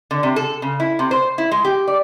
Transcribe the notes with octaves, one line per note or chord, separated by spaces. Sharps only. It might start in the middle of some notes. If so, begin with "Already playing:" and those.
D3
C3
A4
C#3
E4
C3
C5
E4
G#3
G4
D5